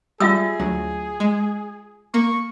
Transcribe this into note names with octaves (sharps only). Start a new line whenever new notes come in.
G3 F4 G#4 E5 E6
D2 F#3
G#3
A#3 C#6